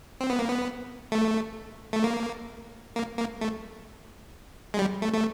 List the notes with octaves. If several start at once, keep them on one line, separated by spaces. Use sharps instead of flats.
C4
B3
A#3
B3
A3
A3
A#3
A#3
A#3
A3
G#3
G3
A3
A3